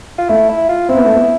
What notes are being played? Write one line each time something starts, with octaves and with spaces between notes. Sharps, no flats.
F4
A3 E4
E4
F4
C4 E4
B3
A3
B3